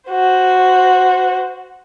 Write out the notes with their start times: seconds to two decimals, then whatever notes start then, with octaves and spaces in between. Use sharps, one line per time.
0.10 F#4 C5